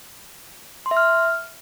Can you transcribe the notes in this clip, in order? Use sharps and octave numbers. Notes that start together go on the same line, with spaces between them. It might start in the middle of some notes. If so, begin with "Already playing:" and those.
C6
E5
F6